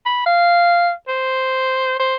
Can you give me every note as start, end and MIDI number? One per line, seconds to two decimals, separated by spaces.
0.06 0.23 83
0.26 0.91 77
1.08 1.98 72
2.00 2.16 72